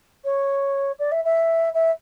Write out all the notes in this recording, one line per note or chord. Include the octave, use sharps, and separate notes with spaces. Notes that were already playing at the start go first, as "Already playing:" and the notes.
C#5
D5
E5
E5
E5